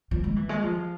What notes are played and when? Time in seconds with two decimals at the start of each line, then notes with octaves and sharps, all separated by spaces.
0.11 F3
0.24 G#3
0.36 E3
0.49 G#3
0.62 F3